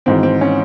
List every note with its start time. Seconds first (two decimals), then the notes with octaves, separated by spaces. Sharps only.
0.06 G#1 G#2 E3 C4
0.23 C4
0.41 C#4